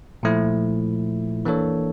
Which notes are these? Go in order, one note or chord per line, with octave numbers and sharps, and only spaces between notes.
A#2 F3 A3 E4
E3 A#3 D4 A4 C#5